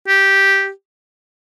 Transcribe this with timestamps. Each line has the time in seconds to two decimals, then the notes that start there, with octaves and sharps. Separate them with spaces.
0.08 G4